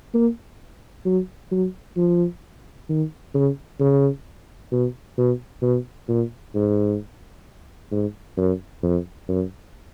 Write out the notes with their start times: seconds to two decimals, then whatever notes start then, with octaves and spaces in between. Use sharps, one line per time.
0.14 A#3
1.05 F#3
1.51 F#3
1.97 F3
2.89 D#3
3.34 C#3
3.80 C#3
4.71 B2
5.17 B2
5.62 B2
6.08 A#2
6.55 G#2
7.91 G#2
8.37 F#2
8.83 F2
9.28 F#2